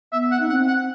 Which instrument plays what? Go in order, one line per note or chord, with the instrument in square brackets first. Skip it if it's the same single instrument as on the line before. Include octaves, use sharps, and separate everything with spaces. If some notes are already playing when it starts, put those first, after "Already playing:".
[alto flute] B3 [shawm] E5
[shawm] F#5
[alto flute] D#4
[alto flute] C4 [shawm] F#5
[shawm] F#5